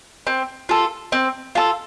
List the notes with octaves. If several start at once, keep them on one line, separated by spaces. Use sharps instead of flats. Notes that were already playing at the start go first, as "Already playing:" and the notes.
C4
F4 A4
C4
F4 A4